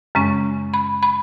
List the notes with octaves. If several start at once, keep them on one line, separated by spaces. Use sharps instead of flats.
F#2 C#3 G#3 C#4
B5
B5